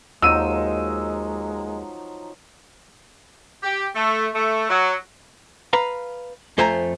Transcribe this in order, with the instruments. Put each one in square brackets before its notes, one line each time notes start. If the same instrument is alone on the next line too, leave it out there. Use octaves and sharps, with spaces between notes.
[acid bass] D#2 [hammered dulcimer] F3 F#3 D#4 [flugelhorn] G#3 [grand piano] E6 D#7
[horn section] G4
A3
A3
F#3
[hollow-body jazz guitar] B4 F5 A#5
F2 A3 C5 E5 G#5 A#5